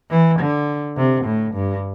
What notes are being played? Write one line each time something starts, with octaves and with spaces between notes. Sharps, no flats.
E3
D3
C3
A2
G2